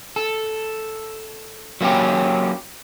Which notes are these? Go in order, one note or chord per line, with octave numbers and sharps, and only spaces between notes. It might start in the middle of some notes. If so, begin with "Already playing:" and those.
A4
F#3 A#3 C#4 G4